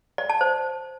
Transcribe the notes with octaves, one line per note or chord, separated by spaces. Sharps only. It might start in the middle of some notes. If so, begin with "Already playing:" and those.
D5
A5
C5